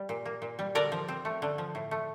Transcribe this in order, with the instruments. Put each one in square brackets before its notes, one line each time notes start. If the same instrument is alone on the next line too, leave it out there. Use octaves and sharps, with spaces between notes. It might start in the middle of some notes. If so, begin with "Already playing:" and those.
Already playing: [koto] G3
A#2
A#3
A#2
G3
D3 A#4 D5
F3
C4
A3
D3
F3
A2
A3